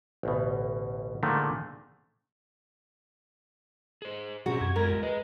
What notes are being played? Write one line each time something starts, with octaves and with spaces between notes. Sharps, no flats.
A1 D2 B2
A#2 D3 D#3 F3 G#3 A3
G#4 C5
B2 C4 C#4 F#4 G#4 A#5
F#2 G#6
G#3 F4 G4 A#4
G#4 B4 D#5